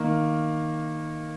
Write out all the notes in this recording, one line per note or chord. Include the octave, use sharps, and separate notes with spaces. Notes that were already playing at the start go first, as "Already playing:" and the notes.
Already playing: D#3 A#3